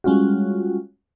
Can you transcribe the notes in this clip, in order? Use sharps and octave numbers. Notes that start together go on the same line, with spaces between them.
G3 G#3 C#4 F4 F#4